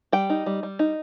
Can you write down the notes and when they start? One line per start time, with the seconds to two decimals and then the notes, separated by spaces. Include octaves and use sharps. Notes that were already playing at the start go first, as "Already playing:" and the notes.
0.12 G3 G5
0.30 D#4
0.46 G3
0.63 G3
0.79 D#4